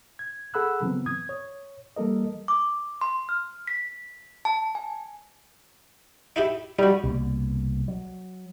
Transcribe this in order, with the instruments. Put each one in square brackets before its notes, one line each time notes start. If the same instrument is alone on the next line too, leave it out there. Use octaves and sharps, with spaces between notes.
[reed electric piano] G#6
G#4 A4 F#5 B5 E6 F#6
C#3 E3 F#3 B3 C4
D#6 G#6
C#5
E3 G3 A#3 A4 A#4 D#5
[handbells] D6
C6
F6
B6
A5
G#5
[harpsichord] D#4 E4 G4
[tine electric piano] G3 [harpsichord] D#4 F#4
[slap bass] C2 B2 A#3
F#3